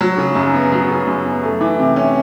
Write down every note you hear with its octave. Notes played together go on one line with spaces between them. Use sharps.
F#3
C#3
F#2
B3
F#3
C#3
F#2
B3
A3
E3
C3
C#4